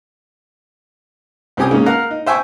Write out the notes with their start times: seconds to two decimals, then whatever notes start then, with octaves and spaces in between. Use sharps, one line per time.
1.57 C2 C4 C#4 G4 G#5 D#6
1.71 G#2 C#3 G#3 A#3 C#4
1.86 A#4 F5 F#5 A#5
2.11 D#4
2.26 C5 E5 G5 G#5 C#6